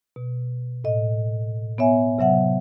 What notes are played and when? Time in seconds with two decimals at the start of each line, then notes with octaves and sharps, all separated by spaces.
0.16 B2
0.84 A2 D#5
1.78 B3 C#5 E5 G#5
2.19 C3 F#3 E5 F#5